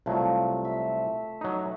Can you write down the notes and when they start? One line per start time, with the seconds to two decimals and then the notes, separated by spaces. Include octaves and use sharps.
0.06 C2 F3 F#3 A3
0.65 E5
1.41 F#3 D#4